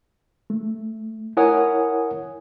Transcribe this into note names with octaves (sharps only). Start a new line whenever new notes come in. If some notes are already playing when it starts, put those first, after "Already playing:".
A3
E4 A#4 C#5 F#5 G#5 D#6